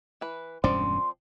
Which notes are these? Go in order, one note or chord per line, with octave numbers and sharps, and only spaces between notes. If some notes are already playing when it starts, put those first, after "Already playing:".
E3 B4
E1 G2 F3 C4 C#4 D5 C6